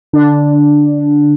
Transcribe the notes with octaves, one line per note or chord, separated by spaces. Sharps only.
D3 D4